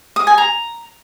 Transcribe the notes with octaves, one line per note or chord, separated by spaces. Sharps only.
D#6
G#5
A#5